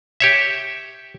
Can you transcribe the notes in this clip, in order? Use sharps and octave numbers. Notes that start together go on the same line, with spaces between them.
G4 C#5 E5